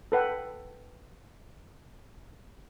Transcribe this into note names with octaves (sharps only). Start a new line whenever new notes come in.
A4 B4 F#5 G5